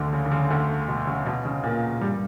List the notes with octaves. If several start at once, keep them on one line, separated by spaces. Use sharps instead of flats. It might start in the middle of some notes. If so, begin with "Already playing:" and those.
Already playing: D2 D3
C#3
D3
C#3
D2 D3
B2
C#3
B2
C#3
A#2 A#3
G2 G3